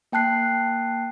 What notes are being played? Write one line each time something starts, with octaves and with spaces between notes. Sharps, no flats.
A#3 G5 A5 F#6 C7